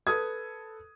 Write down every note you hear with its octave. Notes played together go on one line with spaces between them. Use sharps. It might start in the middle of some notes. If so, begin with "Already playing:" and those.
A4 B4 D#6 G#6